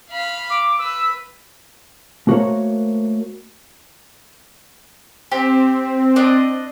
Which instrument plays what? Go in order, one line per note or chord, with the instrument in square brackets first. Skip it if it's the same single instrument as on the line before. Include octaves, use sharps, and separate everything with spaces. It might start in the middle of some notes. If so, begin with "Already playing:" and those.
[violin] F5 B5
[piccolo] D6
[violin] B4 [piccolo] E6
[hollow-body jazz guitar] A3 A#3 F#4 A#4 C5 C#5
[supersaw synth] C4 [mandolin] G4
[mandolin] D4 D5 D#5